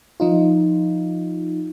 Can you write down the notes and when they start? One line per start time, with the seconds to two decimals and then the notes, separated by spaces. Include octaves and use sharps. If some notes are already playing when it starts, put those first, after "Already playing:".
0.20 F3 D#4 F4